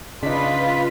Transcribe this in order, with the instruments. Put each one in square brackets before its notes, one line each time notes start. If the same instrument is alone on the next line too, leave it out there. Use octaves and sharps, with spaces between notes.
[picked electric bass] C#3 [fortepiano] D4 D#4 [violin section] F4 B4 [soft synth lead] B6